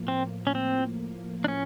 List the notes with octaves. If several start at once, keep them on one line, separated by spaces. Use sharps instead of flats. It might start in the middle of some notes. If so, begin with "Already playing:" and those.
Already playing: A2 F3 A#3
C4
C#4
C4
D4
C#4